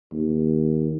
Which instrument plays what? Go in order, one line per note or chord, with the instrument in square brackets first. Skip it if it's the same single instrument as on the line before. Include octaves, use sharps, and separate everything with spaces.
[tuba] D#2